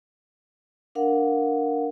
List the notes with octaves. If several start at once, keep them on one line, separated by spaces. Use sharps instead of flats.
D4 A#4 F5 F#5